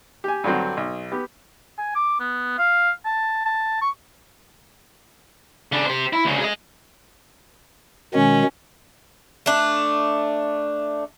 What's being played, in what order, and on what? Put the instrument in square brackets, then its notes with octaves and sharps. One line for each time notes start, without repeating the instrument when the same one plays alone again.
[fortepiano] G4 G#5
G2 D3 F#3 C4
B1
B3 G4
[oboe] G#5
D6
B3
F5
A5
A5
C#6
[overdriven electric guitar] C#3 D4
G4 C5
E4
D2 C#3
G#4 D#5
[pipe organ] B2 D#3 G#3 [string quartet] C#4
[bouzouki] A3 D4